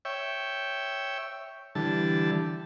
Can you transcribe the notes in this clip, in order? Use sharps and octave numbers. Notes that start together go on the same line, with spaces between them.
C#5 E5 G5
D3 E3 G3 A5